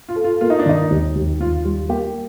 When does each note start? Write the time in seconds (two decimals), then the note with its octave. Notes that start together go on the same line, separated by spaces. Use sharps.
0.09 F4
0.16 A4
0.24 F4
0.41 A#3 F4
0.50 D#4
0.59 D4
0.66 D#3 D#4
0.90 D#2
1.15 D#2
1.40 D#2 F4
1.65 G3 F4
1.89 A#3 G4